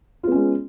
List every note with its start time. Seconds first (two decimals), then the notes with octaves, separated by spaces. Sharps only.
0.23 F4
0.27 B3
0.31 C#4
0.35 G#3